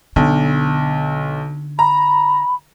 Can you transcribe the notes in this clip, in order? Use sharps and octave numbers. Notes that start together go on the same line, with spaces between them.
B1 D3
A#5 B5